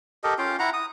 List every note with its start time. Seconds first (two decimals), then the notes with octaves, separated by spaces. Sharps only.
0.24 G4 A4 A#4 D#5
0.38 C#4 F4 F5 G5
0.59 E4 F#5 A#5
0.74 D#6